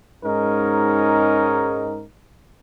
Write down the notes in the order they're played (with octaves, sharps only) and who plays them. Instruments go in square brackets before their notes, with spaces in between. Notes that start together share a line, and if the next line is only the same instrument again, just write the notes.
[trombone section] G#2 G#3 C#4 D#4 A#4